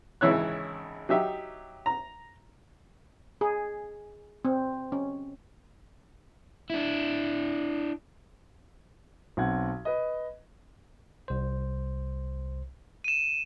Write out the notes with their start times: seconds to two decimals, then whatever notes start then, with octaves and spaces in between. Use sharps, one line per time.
0.21 G#1 C#3 E3 E4 C#5 F#6
1.09 F#3 D#4 G4 E5
1.86 A#5
3.41 G#4
4.45 C4
4.92 C#4
6.70 D4 E4
9.37 B1 C4 F#5 G#6
9.85 B4 D#5
11.28 C2 C5
13.04 D#7 E7